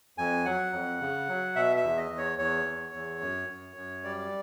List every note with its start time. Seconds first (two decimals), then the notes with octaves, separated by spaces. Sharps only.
0.18 F2 G#5
0.45 F#3 F#5
0.73 F2
1.01 C#3
1.28 F#3
1.56 B2 E5
1.77 E5
1.83 E2
1.97 D#5
2.11 E2
2.18 C#5
2.39 E2 C#5
2.66 E2
2.94 E2
3.21 F#2
3.49 F#2
3.76 F#2
4.04 G3 D5